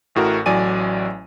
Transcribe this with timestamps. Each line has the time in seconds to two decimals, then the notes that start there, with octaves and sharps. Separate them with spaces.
0.15 A1 A2 F#4 A#4
0.46 A1 A2 F#3 D5 G#5 D#7